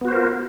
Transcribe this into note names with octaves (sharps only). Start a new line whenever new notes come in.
B3 F4 F#4 A#4 C5